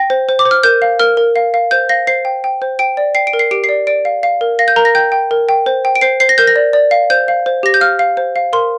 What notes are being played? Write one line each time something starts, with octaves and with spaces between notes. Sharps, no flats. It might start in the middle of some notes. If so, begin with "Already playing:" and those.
Already playing: G5 A#6
C5
C5
D6
C5
F6
A#4 G6
F5
A#4 F6
A#4
F5
F5
C5 G6
F5 A#6
C5 C7
G5
G5
C5
G5 D7
D5
G5 C7
D7
A#4
C7
G4 D7
C7
D5
D5 D7
F5
F5
A#4
F5 A#6
G6
A#4 A#5
A#6
G5 G6
G5
A#4
G5
C5
G5
D7
C5 C7
C5 C7
A#6
A#4 G6
A#6
D5
D5
F5
C5 G6
F5
C5
G4 A#6
G6
F5 F6
F5
C5
F5
A#4 C6